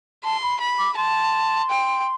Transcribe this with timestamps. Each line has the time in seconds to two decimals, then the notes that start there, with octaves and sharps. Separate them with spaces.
0.24 A5 C6
0.42 B5
0.61 B5
0.78 D6
0.97 A5 C6
1.70 G5